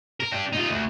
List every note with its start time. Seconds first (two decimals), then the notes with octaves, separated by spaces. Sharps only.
0.20 A#4
0.32 D4 G4
0.53 D#4 F4
0.69 D2